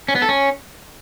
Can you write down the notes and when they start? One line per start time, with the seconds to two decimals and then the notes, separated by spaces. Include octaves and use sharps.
0.08 C#4
0.15 B3
0.22 A4
0.29 C#4